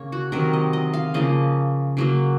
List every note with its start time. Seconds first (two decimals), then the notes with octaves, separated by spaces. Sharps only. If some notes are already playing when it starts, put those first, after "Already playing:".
Already playing: C#3 A#3 C#5
0.12 F#4
0.32 C3 D#3 F#3 A#4
0.53 D#5
0.73 D#5
0.94 F5
1.14 C#3 F3 A#3 D#5
1.97 C#3 F#3 A#3